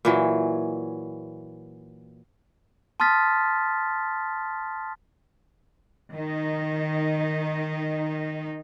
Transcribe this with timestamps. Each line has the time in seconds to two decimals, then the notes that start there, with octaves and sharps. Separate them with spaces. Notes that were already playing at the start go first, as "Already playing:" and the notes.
0.05 A#2 E3 F#3
3.00 A5 C6 D#6 F6 A6 B6
6.14 D#3 D#4